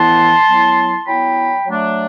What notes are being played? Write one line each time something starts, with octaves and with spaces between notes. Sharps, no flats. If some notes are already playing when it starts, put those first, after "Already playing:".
Already playing: A2 E3 B3 E4 A5 C6
F#3 B3 E4
F#3 B3 E4 G5 B5
F#3 A3 D4